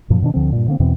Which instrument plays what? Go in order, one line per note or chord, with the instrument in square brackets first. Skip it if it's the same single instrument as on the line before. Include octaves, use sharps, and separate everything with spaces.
[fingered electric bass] F#2 A#2 F3
B2 D#3 D4
D2 D3 F3 C4
G2 A#2
D3 A#3 C4
E2 B2 E3 C4